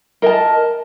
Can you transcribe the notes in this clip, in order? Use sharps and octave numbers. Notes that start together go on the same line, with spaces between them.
A#4 D#5 A5